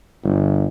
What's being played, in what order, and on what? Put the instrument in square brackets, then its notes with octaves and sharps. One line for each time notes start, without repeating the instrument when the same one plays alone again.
[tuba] G1